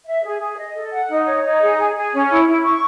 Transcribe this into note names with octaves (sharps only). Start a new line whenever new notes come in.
E5
G#4
G#4
D#5
A4
F#5
D#4
C#5
D#4
G#4
G#4
G#4
C#4
E4
E4
C#6